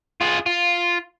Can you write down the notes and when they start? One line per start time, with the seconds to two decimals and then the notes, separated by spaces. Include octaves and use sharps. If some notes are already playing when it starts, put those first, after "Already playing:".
0.21 F4 G#4
0.46 F4